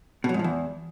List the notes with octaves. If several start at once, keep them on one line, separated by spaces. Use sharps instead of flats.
B2
F#3
G#2
F3
E2